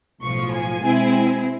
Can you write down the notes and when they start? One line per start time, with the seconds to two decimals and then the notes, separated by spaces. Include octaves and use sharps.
0.22 B1 A2 F3 C#6
0.53 G#5
0.83 B2 G#3 C4 E4